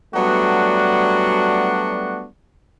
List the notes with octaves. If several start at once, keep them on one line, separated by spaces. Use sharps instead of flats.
F#3 G3 A3 B3 D4 F#4